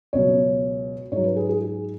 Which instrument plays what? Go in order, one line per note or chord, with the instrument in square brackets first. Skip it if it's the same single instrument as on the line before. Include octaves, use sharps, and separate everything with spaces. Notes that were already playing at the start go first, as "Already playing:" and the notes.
[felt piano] C#2 B2 F#3 C#5
G#2 F#3 C#5
B4
G#4
G#4
G#4